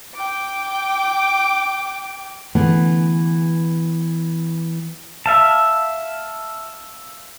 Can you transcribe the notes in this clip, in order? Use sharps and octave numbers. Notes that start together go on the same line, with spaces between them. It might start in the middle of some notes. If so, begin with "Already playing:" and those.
G5 D6
D3 E3 A3 B3 G#4
E5 F5 A5